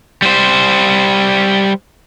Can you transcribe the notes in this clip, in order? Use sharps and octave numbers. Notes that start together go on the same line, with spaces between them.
G3 C5